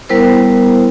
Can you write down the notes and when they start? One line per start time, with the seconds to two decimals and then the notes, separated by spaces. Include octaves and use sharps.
0.09 G3 B3 E4 A#4 C5